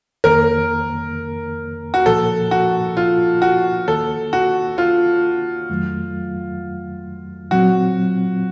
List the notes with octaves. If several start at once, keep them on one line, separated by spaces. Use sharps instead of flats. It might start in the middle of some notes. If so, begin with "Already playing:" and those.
F2 D#3 A#3 A#4
F#4
A#2 F3 A#3 A4
F#4
F4
F#4
D#2 D#3 A#3 A4
F#4
F4
F2 D#3 F#3 A3
A#2 F#3 C4 F#4